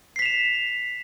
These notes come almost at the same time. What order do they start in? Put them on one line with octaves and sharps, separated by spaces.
C7 B6 F7 E7